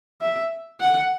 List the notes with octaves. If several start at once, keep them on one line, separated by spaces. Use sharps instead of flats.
E5
F#5